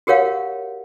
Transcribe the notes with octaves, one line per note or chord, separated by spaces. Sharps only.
F#4 G4 A#4 C#5 F5 F#5